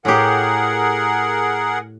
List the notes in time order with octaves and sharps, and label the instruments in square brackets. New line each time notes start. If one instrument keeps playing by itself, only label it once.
[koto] A2 G4 [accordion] G#4 A#4 F#5